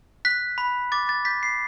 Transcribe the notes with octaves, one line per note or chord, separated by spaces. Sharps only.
F#6 B6
B5
D6 A6
A6
G6 B6
C7